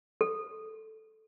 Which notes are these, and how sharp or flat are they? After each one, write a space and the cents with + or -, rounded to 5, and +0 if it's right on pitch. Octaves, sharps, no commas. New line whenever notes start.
A4 -5